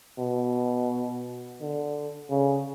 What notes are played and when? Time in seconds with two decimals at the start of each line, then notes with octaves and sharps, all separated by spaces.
0.19 B2
1.62 D3
2.30 C#3